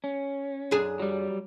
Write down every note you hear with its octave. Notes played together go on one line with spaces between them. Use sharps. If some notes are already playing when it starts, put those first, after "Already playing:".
C#4
F#2 D4 G#4
F#3 G3